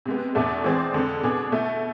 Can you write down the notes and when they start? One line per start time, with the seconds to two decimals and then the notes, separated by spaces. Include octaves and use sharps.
0.06 C3 G#3 B3
0.35 E2 B2 A3 D4
0.64 E3 G#3 C4 G#4 D5
0.94 F2 D3 G#3
1.23 B2 B3 D4 G#4
1.52 B2 A3 E4